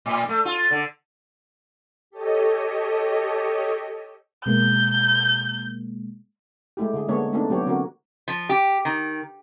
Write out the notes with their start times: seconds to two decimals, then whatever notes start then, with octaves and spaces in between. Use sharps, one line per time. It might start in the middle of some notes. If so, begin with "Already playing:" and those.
0.06 A2
0.29 A3
0.45 F4
0.71 D3
2.10 G4 A4 C#5 D#5
4.46 B2 G#3 A#3 G6
6.77 G#3 A3 E4 G4
6.94 D3 G#4
7.08 D3 G#3 A#3 B3 D4 C#5
7.32 A3 A#3 C4 D4 D#4 F4
7.49 F#3 G3 B3 G4 C#5
7.66 D3 C4 C#4 F#4 A#4
8.28 F3
8.49 G4
8.85 D#3